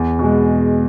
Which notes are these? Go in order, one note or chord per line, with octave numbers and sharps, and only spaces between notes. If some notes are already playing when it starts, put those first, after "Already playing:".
Already playing: E2
B2 G#3